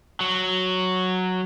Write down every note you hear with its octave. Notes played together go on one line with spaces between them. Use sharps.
F#3